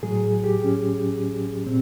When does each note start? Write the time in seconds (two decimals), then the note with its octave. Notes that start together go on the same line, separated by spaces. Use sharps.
0.03 A2 F#3 G#4
0.44 G4
0.64 C#4
1.66 A#2 C4